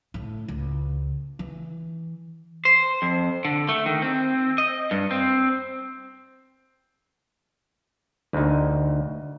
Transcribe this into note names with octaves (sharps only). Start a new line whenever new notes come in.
A2
C#2
E3
C5
F2
D3
A3
D#3
C4
D#5
G2
C4
D2 D#4